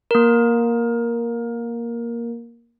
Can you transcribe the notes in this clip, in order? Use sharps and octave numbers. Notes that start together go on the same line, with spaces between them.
A#3 A#4